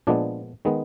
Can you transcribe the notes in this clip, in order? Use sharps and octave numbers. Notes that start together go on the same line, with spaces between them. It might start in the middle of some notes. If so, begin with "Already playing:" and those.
A#2 F3 G#3 B3 D4 D5
D#3 G#3 B3